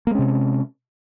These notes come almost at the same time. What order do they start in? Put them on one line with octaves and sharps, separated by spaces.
A#3 G#3 C#4 C3